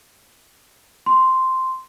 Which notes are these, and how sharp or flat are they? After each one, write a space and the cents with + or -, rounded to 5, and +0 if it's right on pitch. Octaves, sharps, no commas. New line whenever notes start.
C6 -5